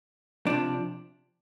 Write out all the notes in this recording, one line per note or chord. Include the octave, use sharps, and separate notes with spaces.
C3 F3 D4